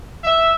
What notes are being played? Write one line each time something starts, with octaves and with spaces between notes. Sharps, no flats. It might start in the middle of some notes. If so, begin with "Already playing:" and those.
E5